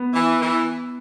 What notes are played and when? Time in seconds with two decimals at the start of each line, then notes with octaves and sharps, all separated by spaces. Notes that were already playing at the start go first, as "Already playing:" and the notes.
Already playing: B3
0.13 E3
0.40 E3